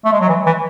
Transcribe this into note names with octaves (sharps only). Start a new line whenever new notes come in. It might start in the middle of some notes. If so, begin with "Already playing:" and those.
A3
G#3
F#3
E3
E3